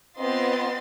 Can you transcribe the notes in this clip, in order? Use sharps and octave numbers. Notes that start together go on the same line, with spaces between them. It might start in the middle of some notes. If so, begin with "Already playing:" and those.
B3 C4 F4 D#5 C6 A6